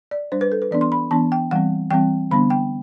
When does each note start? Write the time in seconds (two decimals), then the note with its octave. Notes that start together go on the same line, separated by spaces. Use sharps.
0.11 D5
0.32 G3 D4 C5
0.41 B4
0.52 A4
0.62 B4
0.71 E3 B3 D4 D5
0.81 C6
0.92 B5
1.11 E3 B3 D4 A5
1.32 G5
1.51 E3 G3 C4 F#5
1.91 E3 G3 C4 G5
2.31 D3 G3 B3 D4 B5
2.50 G5